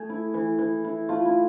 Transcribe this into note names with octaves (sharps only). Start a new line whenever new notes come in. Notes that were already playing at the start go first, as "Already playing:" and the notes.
Already playing: A3 G#4
E4
E3
E3
E4
A3 F4
E4